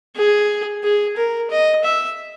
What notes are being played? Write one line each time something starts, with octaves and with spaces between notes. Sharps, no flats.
G#4
G#4
A#4
D#5
E5